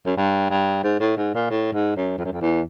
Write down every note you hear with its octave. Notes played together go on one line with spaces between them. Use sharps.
F#2
G2
G2
G#2
A2
G#2
A#2
A2
G#2
F#2
F2
F#2
F2
E2